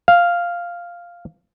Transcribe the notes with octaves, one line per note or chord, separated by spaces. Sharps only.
F5